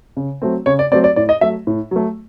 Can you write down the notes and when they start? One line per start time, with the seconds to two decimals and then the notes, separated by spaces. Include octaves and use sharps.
0.17 C#3
0.42 F#3 A3 C4
0.66 C#3 C#5
0.79 D5
0.92 F#3 A3 C4 D5
1.04 D5
1.16 A2 D5
1.29 D#5
1.41 F#3 A3 E5
1.67 A2
1.91 F#3 A3